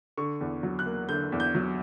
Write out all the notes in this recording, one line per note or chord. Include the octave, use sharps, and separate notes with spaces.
D3 C#6
E2
F#3
F#6
A#3
D3 G6
E2
G6
F#3